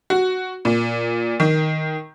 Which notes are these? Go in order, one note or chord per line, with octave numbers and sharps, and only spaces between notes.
F#4
A#2
D#3